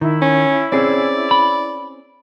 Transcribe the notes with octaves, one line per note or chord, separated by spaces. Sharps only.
D#3 E4
C#4
C4 C#4 G#4 D5
B5